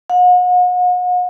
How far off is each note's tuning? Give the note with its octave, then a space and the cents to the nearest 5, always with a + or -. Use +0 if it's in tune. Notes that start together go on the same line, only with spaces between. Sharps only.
F#5 -40